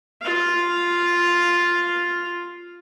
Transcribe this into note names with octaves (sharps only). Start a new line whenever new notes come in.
F4 F5